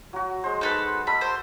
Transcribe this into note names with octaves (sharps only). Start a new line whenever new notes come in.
F#3 F#4
G#3 C5
D#4 A4 B4
A4 D#5 B5
C5